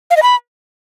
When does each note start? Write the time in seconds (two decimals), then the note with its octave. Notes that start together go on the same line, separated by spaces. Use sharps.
0.11 F5
0.17 D#5
0.23 B5